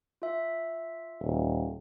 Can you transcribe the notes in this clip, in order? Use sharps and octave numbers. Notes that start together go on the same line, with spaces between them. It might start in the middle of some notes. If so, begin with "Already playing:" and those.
F4 E5
D#1